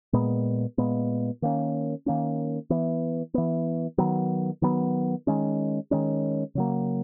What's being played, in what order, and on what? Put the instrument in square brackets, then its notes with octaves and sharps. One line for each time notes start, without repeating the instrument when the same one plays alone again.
[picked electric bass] A#2 G#3 B3
A#2 G#3 B3
D#3 A#3 C#4
D#3 A#3 C#4
E3 B3
E3 B3
D#3 F#3 B3
D#3 F#3 B3
D#3 G#3 C#4
D#3 G#3 C#4
C#3 F#3 A#3